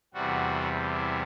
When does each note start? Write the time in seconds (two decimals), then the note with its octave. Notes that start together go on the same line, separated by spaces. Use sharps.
0.14 E2 C3 G3 F#4
0.93 E4